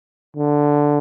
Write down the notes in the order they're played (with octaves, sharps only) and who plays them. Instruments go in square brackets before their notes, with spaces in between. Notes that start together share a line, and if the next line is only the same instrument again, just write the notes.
[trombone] D3